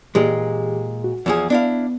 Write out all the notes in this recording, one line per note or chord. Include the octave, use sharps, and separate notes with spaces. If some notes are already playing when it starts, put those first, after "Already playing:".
A#2 E3 G#3 G4 G#4
F#4
E2 F3 G#4
B3 D4 E4 F5